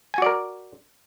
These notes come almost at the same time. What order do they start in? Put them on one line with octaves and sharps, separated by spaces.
G#5 F#4 D5 A#4